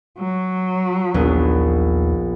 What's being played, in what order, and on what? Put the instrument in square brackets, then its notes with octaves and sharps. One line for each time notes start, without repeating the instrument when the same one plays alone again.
[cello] F#3
[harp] A#1 B3 [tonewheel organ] D#2